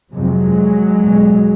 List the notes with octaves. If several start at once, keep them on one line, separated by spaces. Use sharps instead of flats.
F2 C3 F#3 G#3
E2 B2